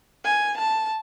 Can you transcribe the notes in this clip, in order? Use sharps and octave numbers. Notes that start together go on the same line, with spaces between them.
G#5
A5